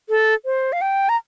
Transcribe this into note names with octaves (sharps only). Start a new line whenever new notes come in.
A4
C5
F5
G5
A#5